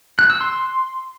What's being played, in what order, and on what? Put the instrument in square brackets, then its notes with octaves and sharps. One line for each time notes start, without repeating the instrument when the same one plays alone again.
[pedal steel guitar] F#6
E6
C6